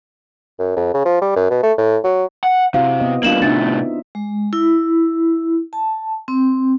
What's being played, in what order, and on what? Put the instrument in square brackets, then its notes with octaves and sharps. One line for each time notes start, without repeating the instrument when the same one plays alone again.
[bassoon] F#2
F2
C#3
F3
G3
F#2
B2
A3
A2
F#3
[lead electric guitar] F#5
[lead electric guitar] C3 [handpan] E4 F#4 C5 [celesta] F5
[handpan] B3 D#5
[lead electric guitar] G3 A#3 [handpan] B3 D4 F4 [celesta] F5 E7 F#7
[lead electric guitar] A2 C3 [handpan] C4 D#4 E5 [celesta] D4 A6
[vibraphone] G#3
E4
A5
C4